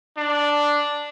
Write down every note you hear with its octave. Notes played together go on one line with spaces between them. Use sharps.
D4